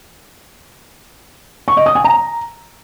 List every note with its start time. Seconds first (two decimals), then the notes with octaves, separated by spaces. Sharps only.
1.68 C#6
1.77 D#5
1.86 D#6
1.95 G#5
2.04 A#5